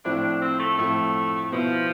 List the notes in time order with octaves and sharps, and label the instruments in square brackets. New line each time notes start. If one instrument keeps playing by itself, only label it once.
[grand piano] A2 F3 C4 E4 [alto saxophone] D4
[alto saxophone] D4
C4
A3
[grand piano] A2 F3 C4 E4 [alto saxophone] A3
[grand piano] B2 B3 E4 [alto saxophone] F3